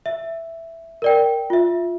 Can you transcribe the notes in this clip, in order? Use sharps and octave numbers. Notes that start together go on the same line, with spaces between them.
E5
A#4 D5 G5
F4 E5